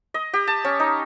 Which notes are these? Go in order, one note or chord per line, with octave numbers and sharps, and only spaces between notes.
D#5
G4
A5
C#4
D#4